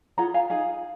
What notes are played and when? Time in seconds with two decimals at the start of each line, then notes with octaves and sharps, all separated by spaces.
0.18 F4 G#4 F#5 A#5
0.34 F5 G#5
0.50 D#4 G#4 F5 G#5